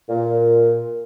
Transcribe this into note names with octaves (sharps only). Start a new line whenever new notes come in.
A#2